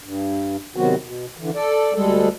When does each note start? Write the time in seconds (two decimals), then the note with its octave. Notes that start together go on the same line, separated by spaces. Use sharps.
0.04 G2
0.76 C3 D#3 F#3 B3 C4 F#4
1.02 B2
1.37 D3 E3
1.55 A4 D5
1.94 D2 G3 G#3 A4